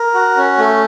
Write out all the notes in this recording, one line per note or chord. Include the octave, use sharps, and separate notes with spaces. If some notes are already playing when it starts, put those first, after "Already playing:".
Already playing: A#4
F#4
C#4
A3